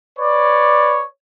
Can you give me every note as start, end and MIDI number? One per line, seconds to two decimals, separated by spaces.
0.19 1.03 71
0.19 1.03 73
0.19 1.03 74